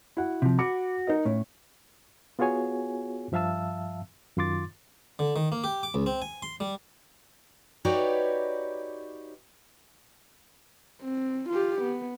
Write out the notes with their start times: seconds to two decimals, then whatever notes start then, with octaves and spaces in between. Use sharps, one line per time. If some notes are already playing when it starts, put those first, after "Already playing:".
0.17 E4 F#4 F#5
0.42 C3 F3
0.59 F#4 B5 D6 C#7
1.07 D#4 A#4 D#5
1.25 A2 C#4
2.39 B3 F4 F#4 G#4 C#5 G#5
3.32 G2 F3 E5 F5 A5 E6
4.37 F#2 D#3 F4 C6 D6 A6
5.19 D3
5.36 D#3
5.52 A#3
5.64 G4
5.83 D6
5.94 C#2
6.06 C4
6.22 G#5
6.42 C6
6.60 G3
7.85 D#4 F#4 G4 B4 C#5 D5
11.02 C4
11.49 F4 G4
11.82 B3